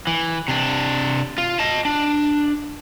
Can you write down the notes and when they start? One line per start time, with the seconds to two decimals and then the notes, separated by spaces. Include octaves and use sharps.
0.07 E3
0.48 C3 D4
1.38 F4
1.59 D#5 A5
1.85 D4